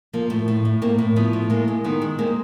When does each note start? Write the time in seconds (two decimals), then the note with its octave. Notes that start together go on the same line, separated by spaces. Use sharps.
0.13 F3 A#3
0.30 A2
0.48 A2
0.65 A2
0.82 A2 A#3 C4
0.98 A2
1.16 F3 B3
1.33 A2
1.50 G#3 A#3
1.68 G#3
1.84 D#3 B3
2.02 G#3
2.19 G#3 A#3 C4